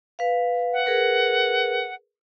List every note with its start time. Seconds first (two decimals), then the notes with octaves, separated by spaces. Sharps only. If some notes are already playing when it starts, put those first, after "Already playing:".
0.19 B4 F5
0.73 F#5
0.86 G#4 A#4 B4